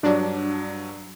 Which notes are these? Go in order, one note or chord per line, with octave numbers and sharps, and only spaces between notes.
G2 F#3 D4